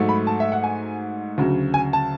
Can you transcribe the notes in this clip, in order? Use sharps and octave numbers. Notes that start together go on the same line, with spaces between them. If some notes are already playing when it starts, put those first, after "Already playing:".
Already playing: G#2 F#3 A3
B5
A5
E5
F#5
G#5
D2 C#3 F#3
G#5
A5